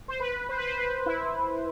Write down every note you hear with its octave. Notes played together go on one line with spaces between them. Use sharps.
C5
B4
C5
B4
C5
B4
E4